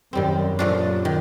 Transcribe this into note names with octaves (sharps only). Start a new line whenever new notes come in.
F#2 D#3 G3 C4
F#2 A#2 F3 A3 D4
D#3